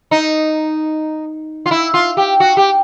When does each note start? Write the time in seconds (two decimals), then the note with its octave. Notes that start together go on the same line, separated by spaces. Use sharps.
0.11 D#4
1.66 F4
1.71 E4
1.94 F4
2.17 G4
2.40 F#4
2.57 G4